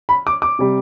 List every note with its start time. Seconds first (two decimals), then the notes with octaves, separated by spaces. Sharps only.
0.09 B5
0.27 D6
0.42 D6
0.59 C3 G3